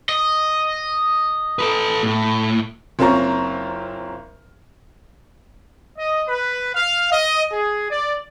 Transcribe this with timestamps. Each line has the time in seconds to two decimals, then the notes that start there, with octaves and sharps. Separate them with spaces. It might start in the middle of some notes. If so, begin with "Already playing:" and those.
0.09 D#5
1.59 A4 B4
2.03 A2
2.99 F#1 C4 C#4 F4 A#5 C#6
5.97 D#5
6.28 B4
6.73 F5
7.11 D#5
7.51 G#4
7.89 D5